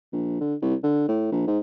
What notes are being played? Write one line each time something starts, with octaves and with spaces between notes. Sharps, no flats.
A#1
D3
C2
D3
A2
A#1
G#2